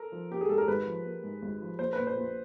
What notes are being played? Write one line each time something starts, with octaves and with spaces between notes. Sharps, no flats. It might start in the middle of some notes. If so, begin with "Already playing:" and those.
Already playing: A4 A#4
F3
A#3 G4
G#4
G#2 A4
A#4
G#1 B4
F3
A#3
G#2
G#1
F3
A#1 C5
B4
A#2
C5
A#1